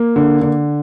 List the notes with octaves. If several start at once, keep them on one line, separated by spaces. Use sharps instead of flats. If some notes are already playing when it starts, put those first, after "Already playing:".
Already playing: A#3
D3
D3